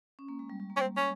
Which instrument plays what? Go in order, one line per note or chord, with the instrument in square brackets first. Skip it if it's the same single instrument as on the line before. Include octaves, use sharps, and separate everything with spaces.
[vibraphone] C#4
A#3
G#3
G3
G3
A#3
[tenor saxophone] C#4
C4
C#4